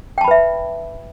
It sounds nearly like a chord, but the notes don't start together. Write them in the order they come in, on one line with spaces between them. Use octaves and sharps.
G5 A5 B5 B4 E5